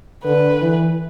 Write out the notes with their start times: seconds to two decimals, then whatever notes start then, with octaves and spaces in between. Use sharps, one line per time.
0.24 D3 B4
0.62 E3